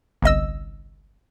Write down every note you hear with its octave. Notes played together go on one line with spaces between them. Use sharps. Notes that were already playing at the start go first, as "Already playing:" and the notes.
G1 C2 D#5 E6